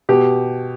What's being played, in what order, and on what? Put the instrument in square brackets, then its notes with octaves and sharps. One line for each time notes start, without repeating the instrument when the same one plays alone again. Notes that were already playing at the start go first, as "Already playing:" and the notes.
[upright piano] B2 G4